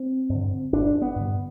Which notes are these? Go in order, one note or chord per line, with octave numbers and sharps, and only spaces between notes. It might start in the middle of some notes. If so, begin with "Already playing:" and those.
Already playing: C4
G2
D3
G1 D4
B3
G2 D3